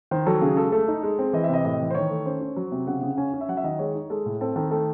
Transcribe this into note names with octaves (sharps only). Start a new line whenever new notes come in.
D#3 C5
F#3 A4
C#3 G#4
G#3 A4
A3 A4
D#4
G#3
C4
E3 D#5
E5
C3 D#5
A2 D#5
E3
C5
D#3 C#5
A3
C#4 C5
C#4
F#3
C3
C#3 F#5
C#3
C#4 G#5
C#4
E5
F#3 F#5
E5
D#3 D#5
G#3 C#5
D#4
G#3 A4
A2
C4 A4
D#3 A4
A3 A4